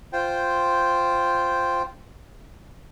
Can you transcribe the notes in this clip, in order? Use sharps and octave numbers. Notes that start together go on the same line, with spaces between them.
F4 C5 G5